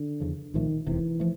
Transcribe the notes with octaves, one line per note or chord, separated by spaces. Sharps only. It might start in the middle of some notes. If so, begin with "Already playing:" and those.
Already playing: D3
E2 C#3 F3
C2 A#2 D#3 F3 A3
E1 D2 C3 E3
F3 A3